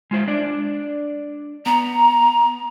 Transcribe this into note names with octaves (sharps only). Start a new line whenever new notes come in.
G#3 F4 C5
D4 D5
B3 A#5